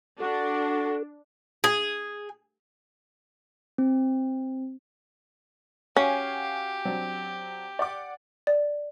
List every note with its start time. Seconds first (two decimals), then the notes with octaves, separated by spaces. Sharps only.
0.20 D4 F#4 A4
1.64 G#4
3.78 C4
5.96 C#4 F#4 G4 F5 G#5
6.85 F#3 C4 D4
7.79 D5 F#5 D6
8.47 D5